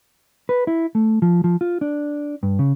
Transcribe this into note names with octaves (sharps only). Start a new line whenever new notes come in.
B4
E4
A3
F3
F3
F4
D4
G2
C#3